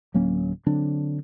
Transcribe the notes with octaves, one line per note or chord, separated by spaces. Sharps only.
D1 F#3 A#3 C#4
D3 F#3 C4 D4